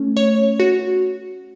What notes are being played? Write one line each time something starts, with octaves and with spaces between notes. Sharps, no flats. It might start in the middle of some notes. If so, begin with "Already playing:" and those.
Already playing: A3 C#4
C#5
F#4